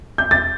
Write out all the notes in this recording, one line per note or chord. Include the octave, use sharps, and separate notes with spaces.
G6
A6